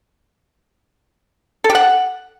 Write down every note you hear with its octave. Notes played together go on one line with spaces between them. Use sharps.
A4
G4
F#5